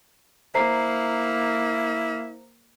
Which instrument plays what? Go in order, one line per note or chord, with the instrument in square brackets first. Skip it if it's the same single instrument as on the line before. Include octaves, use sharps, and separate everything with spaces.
[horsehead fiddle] A#3 [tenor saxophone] E4 [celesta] C5 A#5 C7